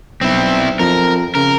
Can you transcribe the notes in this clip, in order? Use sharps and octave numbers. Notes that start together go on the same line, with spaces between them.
B1 C4 E4
F2 A#4
C#3 A#4